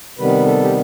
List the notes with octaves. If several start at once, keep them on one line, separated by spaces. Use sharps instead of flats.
C3 D#3 G3 B3 B4
A4
G4